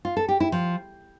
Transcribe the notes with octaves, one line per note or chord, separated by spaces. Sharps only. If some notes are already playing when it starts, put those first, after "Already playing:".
F4
A4
G4
E4
F3